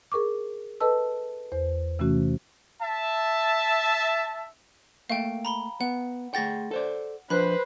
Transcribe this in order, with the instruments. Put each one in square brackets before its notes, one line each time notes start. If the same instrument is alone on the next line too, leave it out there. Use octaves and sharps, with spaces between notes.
[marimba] G#4 A#4 C#6 D6
A4 B4 D#5 A5 E6
E2 C5
C3 E3 A3 C#4 F#4
[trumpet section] E5 A5
[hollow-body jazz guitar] A3 A#3 E5 [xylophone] F5 G5
[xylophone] A#5 B5 G7
[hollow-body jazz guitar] B3 [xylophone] F#5
[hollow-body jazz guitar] A3 G#4 G5 [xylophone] F#5 A6 A#6
[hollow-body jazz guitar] A4 C5 D5
[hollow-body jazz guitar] F3 D4 [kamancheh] B4 C5 [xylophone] B5 F#6